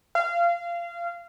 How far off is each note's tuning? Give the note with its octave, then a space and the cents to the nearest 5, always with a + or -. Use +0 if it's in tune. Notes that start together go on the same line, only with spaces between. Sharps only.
F5 -25